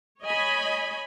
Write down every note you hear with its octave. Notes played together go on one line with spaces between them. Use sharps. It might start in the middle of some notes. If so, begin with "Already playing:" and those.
C#5 D#5 G#5 B5